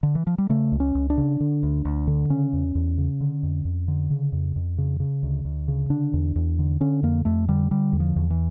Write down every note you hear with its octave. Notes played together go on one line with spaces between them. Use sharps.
D3
E3
F3
G3
C#3 A3
C#2
C#4
C#2
D4
C#3
D3
D2
D2
D3
C#3 C#4
E2
E2
C#3
D3
F2
F2
D3
C#3
F2
F2
C#3
C#3
D2
D2
C#3
D3 D4
E2
E2
D3
D3 C#4
F2 A#3
F2 A3
D3 G3
D3 G3
E2
F3
E2
E3